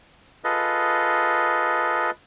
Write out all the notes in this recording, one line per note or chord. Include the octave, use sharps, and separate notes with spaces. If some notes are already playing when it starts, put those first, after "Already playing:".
F4 G#4 A4 B4 D#5